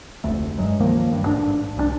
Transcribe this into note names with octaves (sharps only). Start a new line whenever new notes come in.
F1 D2 A3
G2 F#3 G#3
C#2 D#3 F3 A#3
G2
A1 G#2 C#4 D4
C2 G3 D4